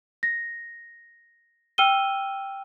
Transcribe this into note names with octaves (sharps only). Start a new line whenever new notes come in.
A#6
G5 E6 F6 D#7 G7